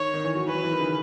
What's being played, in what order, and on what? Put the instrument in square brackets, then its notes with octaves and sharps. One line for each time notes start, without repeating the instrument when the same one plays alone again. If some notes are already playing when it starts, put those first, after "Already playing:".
Already playing: [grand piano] D#3 [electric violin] C#5
[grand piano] D#3
E3
F#3
[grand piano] E3 [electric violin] B4
[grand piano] F#3
E3
D#3
C#3